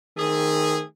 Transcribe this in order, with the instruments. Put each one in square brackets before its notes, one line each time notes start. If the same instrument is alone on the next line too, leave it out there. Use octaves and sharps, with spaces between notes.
[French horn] D#3 [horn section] A3 C4 G#4